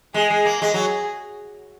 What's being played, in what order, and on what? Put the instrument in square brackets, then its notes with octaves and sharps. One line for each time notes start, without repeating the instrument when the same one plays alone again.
[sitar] G#3 [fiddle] G#4
[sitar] G#3
A#3
[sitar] G#3 [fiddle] G#4
[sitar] F#3